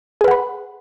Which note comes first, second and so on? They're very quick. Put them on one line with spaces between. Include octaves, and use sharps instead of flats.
G#4 B4 F#5 B5